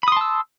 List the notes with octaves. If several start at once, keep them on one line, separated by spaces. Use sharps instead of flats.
A5 B5 C6 D#6 E6